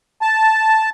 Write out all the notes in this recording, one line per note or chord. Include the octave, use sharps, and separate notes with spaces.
A5